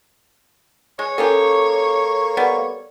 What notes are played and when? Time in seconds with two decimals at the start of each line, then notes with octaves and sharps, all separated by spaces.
0.99 G#3 C#5
1.18 A#3 C#4 F4 G4 A4 A#4 C#6
2.37 G3 B3